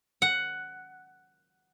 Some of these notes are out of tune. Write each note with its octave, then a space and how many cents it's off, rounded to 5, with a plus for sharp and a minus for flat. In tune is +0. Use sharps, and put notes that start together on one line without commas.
F#5 +5